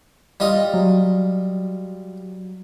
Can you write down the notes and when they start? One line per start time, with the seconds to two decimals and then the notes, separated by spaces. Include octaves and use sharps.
0.40 G3 F4 D#5
0.74 F#3